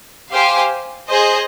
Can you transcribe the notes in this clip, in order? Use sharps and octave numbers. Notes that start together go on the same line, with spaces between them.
G4 C5 F5 G#5
G#4 C5 D#5